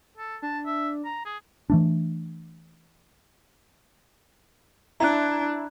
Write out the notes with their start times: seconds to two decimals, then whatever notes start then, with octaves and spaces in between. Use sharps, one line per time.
0.17 A4
0.42 D4 A5
0.66 E5
1.05 A#5
1.25 G#4
1.70 E3 A3 D4
5.00 D4 E4 A#5 F#6